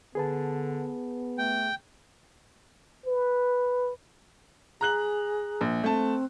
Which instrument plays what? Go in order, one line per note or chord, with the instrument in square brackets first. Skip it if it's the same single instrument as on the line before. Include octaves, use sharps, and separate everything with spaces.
[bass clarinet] D3 [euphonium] B3 [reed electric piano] G#4 B4 A5
[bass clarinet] A3 [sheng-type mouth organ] G5
[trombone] B4
[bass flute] G#4 [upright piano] A#5 F#6 F#7
[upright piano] A#1
[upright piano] A3 A5 [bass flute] C4